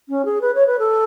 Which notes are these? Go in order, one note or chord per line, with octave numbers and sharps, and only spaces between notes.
C#4
G#4
B4
C#5
B4
A4